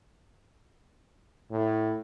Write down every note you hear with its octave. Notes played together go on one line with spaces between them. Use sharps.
A2